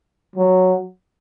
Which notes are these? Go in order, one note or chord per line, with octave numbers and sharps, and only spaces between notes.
F#3